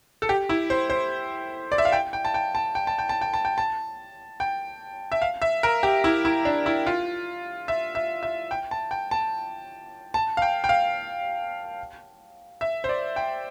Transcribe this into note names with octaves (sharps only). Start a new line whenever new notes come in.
A4
G4
E4
C5
C5
D5
E5
F5
G5
G5
A5
G5
A5
G5
A5
G5
A5
G5
A5
G5
A5
G5
E5
F5
E5
A#4
G4
E4
E4
D4
E4
F4
E5
E5
E5
G5
A5
G5
A5
A5
F5
G5
G5
F5
E5
C5
D5
G5